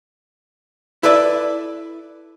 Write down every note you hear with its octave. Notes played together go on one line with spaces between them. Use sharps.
E4 A4 B4 D5 E5